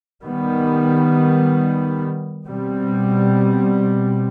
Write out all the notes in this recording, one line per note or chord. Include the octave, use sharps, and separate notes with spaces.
D#3 G3 B3
B2 G3 C4